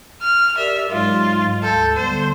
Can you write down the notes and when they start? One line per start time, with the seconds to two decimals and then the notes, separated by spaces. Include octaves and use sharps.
0.22 F6
0.57 G4 A#4 D5 E5
0.91 G#2 F#3 G#3 F4
1.63 D2 A4 G6
1.97 D3 G3 B3 C5